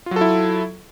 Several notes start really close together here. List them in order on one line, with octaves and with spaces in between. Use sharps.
F4 F#3 A4 E4